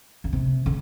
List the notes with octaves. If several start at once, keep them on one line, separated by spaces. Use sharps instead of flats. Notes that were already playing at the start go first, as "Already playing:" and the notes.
D3
C3
D3